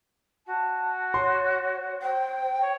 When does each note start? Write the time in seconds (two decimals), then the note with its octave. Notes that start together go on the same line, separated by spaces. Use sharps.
0.46 F#4 A5
1.14 C#5 C6
2.02 C5 G5
2.60 C#5